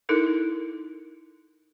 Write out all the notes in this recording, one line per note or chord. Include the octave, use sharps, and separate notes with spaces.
D#4 E4 A4 A#4